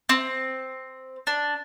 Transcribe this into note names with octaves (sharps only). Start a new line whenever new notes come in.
C4
D4